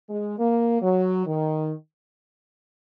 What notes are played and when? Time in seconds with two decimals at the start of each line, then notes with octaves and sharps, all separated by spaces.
0.09 G#3
0.38 A#3
0.81 F#3
1.26 D#3